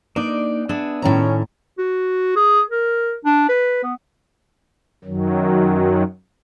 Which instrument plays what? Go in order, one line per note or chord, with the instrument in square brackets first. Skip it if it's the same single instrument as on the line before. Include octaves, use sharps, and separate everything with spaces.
[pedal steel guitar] A#3 D4 D#4 [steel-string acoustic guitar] D5
[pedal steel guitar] B3 G#4 E5 [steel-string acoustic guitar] D4
[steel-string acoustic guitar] A2 D#3 A#5 [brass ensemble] C#4
[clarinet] F#4
G#4
A#4
D4
B4
B3
[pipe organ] F#2 D#3 F#3